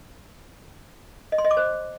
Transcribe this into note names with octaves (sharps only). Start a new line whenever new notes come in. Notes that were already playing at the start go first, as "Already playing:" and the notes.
D#5
C6
D#5
D6
C5